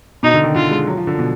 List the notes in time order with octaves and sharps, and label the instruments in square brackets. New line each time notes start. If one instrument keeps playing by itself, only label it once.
[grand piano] B2 [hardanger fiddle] D#4
[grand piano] D3
D#3
[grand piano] D3 [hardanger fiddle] F4
[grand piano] G#3
F#3
F3
D3
B2